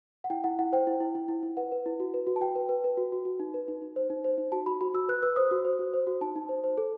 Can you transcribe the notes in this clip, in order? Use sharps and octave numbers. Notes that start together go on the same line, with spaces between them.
F#5
E4 G5
E4 F#5
E4 F#5
C5 G5
E4
E4
E4
E4
E4
B4 F#5
B4
E4
F#4
B4
F#4
A5
F#4 G5
B4
B4
B4
F#4
F#4
F#4
D#4
B4
D#4
D#4
C5
D#4
C5
D#4
F#4 A5
F#4 B5
F#4 B5
F#4 E6
B4 F#6
B4 E6
C5 D#6
F#4
C5
F#4
C5
F#4
D#4 A5
D#4
C5
C5
A4